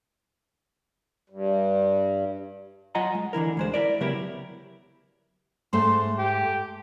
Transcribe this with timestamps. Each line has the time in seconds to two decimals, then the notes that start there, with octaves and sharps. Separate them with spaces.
1.30 G2
2.95 F#3 F4 D#5 F#5 G#5 A#5
3.15 G#3
3.33 D3 E3 E4 A#4
3.57 D2 G#3 C5
3.74 E4 A#4 D5
4.00 C#3 F#3 B3 E4 G4 A#4
5.73 G#2 A3 C5 C6
6.18 G4